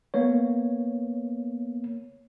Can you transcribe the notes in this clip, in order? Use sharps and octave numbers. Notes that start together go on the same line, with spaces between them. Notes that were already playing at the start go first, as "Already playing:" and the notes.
A#3 B3 C#5